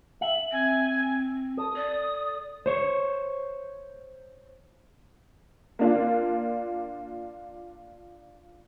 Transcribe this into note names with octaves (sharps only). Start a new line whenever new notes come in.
E5 F#7
C4 G#5
A4 D#6
D5
C5 C#5
A#3 D4 F4